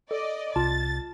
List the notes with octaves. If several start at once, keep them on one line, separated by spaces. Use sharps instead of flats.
A4 D5 D#5
C2 F4 A5 A6